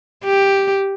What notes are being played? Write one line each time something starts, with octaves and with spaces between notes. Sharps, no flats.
G4